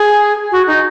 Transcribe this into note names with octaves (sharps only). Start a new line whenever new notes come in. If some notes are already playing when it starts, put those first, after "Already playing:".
Already playing: G#4
F#4
D#4